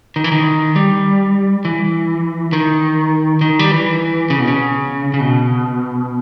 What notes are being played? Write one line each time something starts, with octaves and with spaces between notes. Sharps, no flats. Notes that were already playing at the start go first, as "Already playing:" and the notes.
D#3
E3
D#3
G3
E3
D#3
D#3
G3
E3
C#3
B2
C#3
C#3
B2